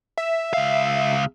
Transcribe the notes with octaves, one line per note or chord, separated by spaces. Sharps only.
E5
C#2 F5